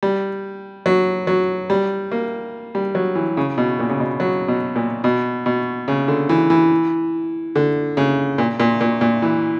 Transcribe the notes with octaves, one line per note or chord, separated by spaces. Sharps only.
G3
F#3
F#3
G3
A#3
G3
F#3
E3
C#3
B2
A#2
C#3
B2
F#3
B2
A#2
B2
B2
C#3
D3
E3
E3
D3
C#3
A#2
A#2
A#2
A#2
E3